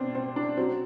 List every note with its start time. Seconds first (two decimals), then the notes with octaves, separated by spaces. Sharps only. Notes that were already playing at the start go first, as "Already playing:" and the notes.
Already playing: B2 C4 D4
0.15 C4
0.36 D4
0.57 F#3 C4